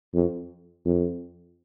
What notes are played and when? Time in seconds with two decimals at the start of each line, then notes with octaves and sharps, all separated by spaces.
0.14 F2
0.85 F2